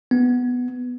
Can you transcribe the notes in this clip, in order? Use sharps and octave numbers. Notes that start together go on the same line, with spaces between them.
B3